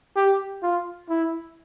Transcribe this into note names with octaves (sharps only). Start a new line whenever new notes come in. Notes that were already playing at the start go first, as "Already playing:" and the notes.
G4
F4
E4